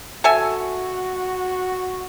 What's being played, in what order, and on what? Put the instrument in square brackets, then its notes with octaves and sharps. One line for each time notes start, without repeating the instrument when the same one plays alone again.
[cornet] F#4 [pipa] A4 E5 G#5